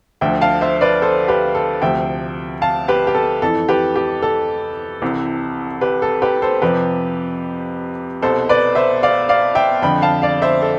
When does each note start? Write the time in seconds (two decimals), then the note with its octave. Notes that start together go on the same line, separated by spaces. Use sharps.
0.21 D2 D3 F3 E5 G5
0.41 F5 A5
0.61 C5 E5
0.81 B4 D5
1.02 A4 C5
1.28 G4 B4
1.55 A4
1.81 D2 C3 F3 E5 G5
2.62 F5 A5
2.88 G4 B4
3.07 G4
3.15 A4
3.42 F2 E3 A4
3.69 G4 B4
3.96 G4
4.22 A4
5.01 C2 C3 E3
5.81 G4 B4
6.02 A4
6.22 G4 B4
6.42 A4 C5
6.62 F2 C3 F3 G4 B4
8.22 C2 B2 A4 C5
8.49 B4 D5
8.75 C5 E5
9.03 D5 F5
9.29 D5 F5
9.55 E5 G5
9.82 F2 D3 F3 G5 B5
10.02 F5 A5
10.22 D5 F5
10.42 C5 E5
10.62 A4